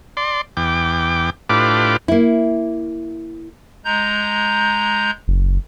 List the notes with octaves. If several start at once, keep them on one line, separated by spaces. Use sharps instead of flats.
D5 C6
E2 G5 D6
A2 D4 F4 G4 B4 D6
A#3 E4
G#3 A#5 G6
F#1